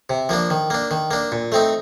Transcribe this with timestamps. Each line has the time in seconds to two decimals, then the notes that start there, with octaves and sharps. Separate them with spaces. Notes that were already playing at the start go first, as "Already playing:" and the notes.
0.10 C3
0.29 F3 A#3 D4
0.50 D#3
0.70 A#3 D4
0.91 D#3
1.11 A#3 D4
1.32 A#2
1.52 A3 C4 D#4